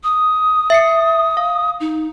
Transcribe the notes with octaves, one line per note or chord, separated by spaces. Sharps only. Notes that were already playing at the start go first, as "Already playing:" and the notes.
D#6
E5 C7 C#7
F5
D#4